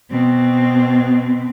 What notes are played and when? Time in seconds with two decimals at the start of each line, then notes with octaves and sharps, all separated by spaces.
0.11 B2 C4